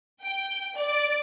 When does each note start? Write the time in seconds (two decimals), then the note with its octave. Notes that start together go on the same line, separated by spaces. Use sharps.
0.22 G5
0.76 D5